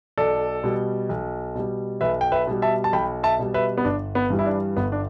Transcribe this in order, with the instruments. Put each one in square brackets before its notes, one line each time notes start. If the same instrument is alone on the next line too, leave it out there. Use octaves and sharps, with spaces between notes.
[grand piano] B1 A4 D5
B2 G3
B1
B2 G3
B1 B4 E5
G5
B4 E5
B2 G3
E5 A5
A5
B1 G5 B5
E5 A5
B2 G3
B4 E5
B3
G1 D4
B3
G2 E3 G3
E4
D4
G1 B3
D4